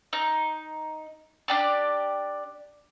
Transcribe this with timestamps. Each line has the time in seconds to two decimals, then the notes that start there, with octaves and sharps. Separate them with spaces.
0.13 D#4
1.48 D4 G4 D5